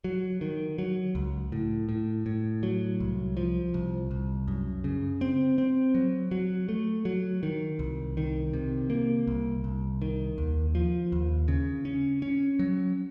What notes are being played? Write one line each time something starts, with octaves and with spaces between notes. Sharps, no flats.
F#3
D#3
F#3
C#2
A2
A2
A2
F#3
C2
F3
C2
C2
F#2
C#3
C4
C4
F#3
F#3
A3
F#3
D#3
C2
D#3
C3
A#3
C2
C2
D#3
D#2
F3
D#2
C#3
C#4
C#4
F#3